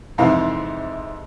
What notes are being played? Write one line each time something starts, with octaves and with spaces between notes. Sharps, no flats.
F2 G#2 C3 E3 F5